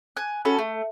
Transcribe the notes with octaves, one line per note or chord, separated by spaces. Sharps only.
G#5 F#6
C#4 F#4 A4 B5
A3